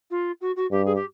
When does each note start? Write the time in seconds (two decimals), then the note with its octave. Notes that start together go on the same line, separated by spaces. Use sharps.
0.11 F4
0.41 F#4
0.56 F#4
0.71 G2 G4
0.85 G#4
0.95 G4